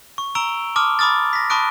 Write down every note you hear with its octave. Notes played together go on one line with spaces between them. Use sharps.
C#6
A#5 C#6 E6 D7 F7 G7
A5 C6 D6 D#6 F6
B5 D6 D#6 F6 A6
A#6 B6
A5 B5 C#6 D#6 F#6 D7